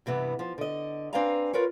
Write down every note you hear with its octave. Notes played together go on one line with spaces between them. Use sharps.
G2 C3 E3 B3
F3
D3 D#5
C4 D4 B4 F5 G#5 A#5
F4 A#4 B4 C#5